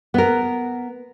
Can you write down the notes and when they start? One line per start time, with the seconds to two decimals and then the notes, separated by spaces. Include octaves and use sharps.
0.14 B3 A#4